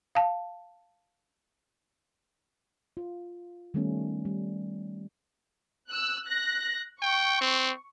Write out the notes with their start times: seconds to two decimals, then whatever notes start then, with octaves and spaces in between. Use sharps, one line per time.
0.15 F5 A5
2.97 F4
3.74 D#3 G3 A3 B3 C#4
4.25 G3
5.89 E6 F#6
6.27 F#6 A#6
7.02 G5 C#6
7.41 C4